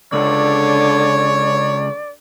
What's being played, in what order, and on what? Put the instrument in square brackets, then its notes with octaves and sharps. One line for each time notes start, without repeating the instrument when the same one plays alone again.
[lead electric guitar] C#2 [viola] D3 [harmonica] C#5 [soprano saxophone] D5